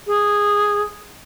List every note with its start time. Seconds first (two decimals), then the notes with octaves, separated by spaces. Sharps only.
0.07 G#4